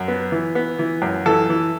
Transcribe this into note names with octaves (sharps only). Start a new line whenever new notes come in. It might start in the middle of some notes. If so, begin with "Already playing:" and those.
Already playing: F#2
B3
E3
B3
E3
F#2
E3 A4
E3